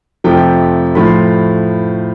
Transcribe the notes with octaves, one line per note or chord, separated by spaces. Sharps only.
F2 C3 F3 A3 G5
A2 F3 A3 B5
C6